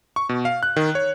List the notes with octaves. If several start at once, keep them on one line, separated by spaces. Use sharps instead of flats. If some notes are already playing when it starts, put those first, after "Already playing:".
C#6
B2
F5
F#6
D#3
C#5